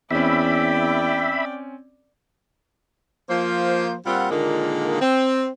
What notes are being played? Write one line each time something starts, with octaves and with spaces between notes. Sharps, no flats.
E2 C4 C#4 D5 E5 G5 B5
F3 A#3 C5
A#2 G3 C4 F4 F#5
A#2 D3 D#3 G#3 A#3 F4
C4